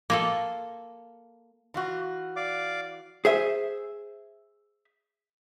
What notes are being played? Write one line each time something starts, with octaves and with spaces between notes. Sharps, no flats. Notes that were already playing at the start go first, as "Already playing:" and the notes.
A#3 F4 A4
E3 F4 F#4
D5 F5 D6
G#4 C5 E5